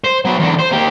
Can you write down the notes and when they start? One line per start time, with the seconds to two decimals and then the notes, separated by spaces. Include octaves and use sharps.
0.04 C5
0.25 F#3 B3
0.39 E2 D3
0.59 C5
0.71 A#3 G4